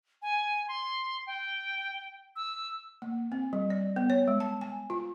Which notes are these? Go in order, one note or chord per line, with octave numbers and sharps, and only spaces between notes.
G#5
C6
G5
E6
A#3
C4
G3
D5
B3
C#5
G#3
A5
G#5
F4